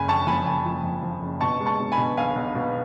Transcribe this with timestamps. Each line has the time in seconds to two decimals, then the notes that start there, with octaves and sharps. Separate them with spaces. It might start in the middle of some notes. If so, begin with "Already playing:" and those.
Already playing: F#1 G#5 B5
0.08 F2 A5 C#6
0.27 F3 G#5 B5
0.46 F#1 G#5 B5
0.66 F3
0.84 F2
1.03 F3
1.22 F#1
1.41 B2 A5 C#6
1.61 G#3
1.66 A5 C#6
1.80 B2
1.92 G#5 B5
1.98 B2
2.17 B1 F5 G#5
2.36 B1
2.55 B2